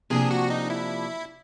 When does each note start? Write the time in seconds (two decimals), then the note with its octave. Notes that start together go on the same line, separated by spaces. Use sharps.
0.10 C3 F3 A#3 D4 G#4
0.31 F#4
0.50 D#4
0.70 E4